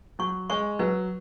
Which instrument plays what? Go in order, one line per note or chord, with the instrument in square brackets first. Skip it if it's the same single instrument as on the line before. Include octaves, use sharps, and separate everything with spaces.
[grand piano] F#3 [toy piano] C#6
[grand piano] G#3 [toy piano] C#6
[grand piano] F#3 [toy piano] B4